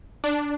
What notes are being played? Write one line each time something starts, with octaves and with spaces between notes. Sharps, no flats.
D4